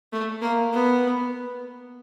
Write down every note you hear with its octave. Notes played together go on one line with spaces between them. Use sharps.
A3
A#3
B3